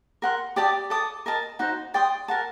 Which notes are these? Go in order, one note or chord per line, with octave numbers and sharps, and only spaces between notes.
A#4 F#5 C6
G4 D5 A5 D#6
A4 D5 A5 D#6
A#4 D#5 A5
D#4 F#4 C5
D5 G5 C6 D#6
A#4 F#5 A5